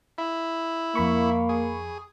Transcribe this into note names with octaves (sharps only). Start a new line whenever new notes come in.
E4
F2 A#3 B5 C#6
G#4